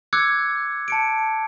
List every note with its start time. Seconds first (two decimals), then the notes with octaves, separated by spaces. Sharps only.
0.13 D6 E6 F#6 G#6 C#7
0.88 A5 C#7 D7